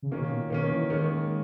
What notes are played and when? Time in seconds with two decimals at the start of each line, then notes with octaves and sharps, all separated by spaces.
0.03 C#3
0.11 B2 D#3 A#3 C#4
0.31 A#2
0.50 B2 D#3 A#3 C#4
0.70 E3
0.90 D#3 G#3 A#3 C#4